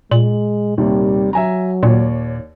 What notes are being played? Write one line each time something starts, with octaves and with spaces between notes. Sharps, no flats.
A#2 G#3 F#7
D#2 C3 D#3 G3
F#3 E5 G#5 A#5
D#2 A#2 C#5 D5